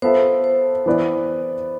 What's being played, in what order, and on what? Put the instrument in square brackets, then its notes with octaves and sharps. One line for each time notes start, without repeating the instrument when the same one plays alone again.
[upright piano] B3 F4 A4 E5 [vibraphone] C5
[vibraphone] C5
[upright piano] E3 B3 E4 B4 D5